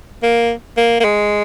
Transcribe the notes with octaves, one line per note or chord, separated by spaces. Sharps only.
A#3
A#3
A#3
G#3